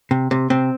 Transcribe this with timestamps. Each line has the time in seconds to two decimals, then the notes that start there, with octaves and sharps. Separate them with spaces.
0.11 C3
0.31 C3
0.50 C3 C4